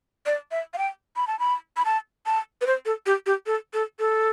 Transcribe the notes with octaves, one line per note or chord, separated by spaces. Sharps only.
D5
E5
F5
G5
B5
A5
B5
B5
A5
A5
B4
C5
A4
G4
G4
A4
A4
A4